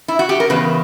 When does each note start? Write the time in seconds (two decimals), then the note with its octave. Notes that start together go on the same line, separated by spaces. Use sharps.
0.08 E4
0.19 F#4
0.29 G4
0.40 A#4
0.50 E2 C#3 B4